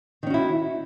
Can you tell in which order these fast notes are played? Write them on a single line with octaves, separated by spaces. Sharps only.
D#3 C#4 F#4 E4